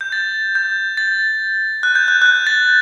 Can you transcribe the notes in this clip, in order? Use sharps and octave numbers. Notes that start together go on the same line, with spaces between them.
G6
A6
G6
A6
F#6
G6
F#6
F#6
G6
A6